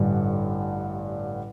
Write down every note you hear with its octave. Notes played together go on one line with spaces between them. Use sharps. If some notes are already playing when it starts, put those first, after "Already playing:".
Already playing: A1 G2 D3